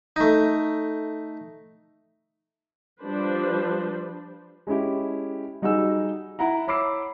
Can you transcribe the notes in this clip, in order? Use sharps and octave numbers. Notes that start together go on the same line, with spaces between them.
A3 D#4
F3 G3 D4 B4 C5
G#3 C#4 E4 G4
G3 D#4 F#4 G#4 E6
E4 F#5 A#5
C#5 B5 D6 E6 C7